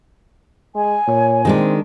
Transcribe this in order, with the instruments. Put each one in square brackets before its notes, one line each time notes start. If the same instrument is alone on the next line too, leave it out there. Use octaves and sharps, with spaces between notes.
[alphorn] G#3 [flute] G#5
[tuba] A#2 [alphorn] C#5
[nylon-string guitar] D#3 G#3 D4 [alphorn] C4